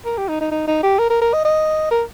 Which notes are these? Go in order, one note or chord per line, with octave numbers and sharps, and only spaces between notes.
A#4
G4
D#4
D#4
D#4
D#4
G4
A#4
A#4
A#4
D#5
D#5
A#4